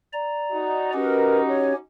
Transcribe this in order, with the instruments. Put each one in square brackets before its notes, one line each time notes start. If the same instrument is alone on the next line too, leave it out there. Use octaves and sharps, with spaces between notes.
[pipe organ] D5 A#5
[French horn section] D#4 F#4
[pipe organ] C#4 G4 [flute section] A#4 B4
[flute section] C#5